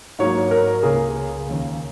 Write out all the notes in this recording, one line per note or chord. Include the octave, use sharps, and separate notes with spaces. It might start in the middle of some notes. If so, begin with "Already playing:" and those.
G#2 F#3 A#3 C#5
A#4
C#2 C#3 A#3 G#4
D#2 C#3 A#3